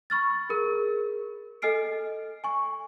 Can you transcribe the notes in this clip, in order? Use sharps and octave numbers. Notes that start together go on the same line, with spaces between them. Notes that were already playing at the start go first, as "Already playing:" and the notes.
B5 C#6 F6 A6
G#4 A#4
A4 D#5 G#5 F6 C7 D7
G#5 C#6